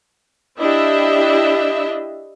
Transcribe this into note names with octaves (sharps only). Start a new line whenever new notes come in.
D4 E4 G4 D#5 E5